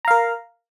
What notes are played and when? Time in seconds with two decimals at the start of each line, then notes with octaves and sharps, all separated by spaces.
0.05 A#5
0.08 F5
0.11 A#4